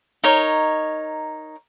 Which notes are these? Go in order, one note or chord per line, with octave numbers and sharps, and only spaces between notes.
D#4 A#4 C#5 D#5